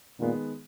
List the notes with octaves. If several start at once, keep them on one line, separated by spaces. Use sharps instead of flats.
A#2 D#3 G#3 B3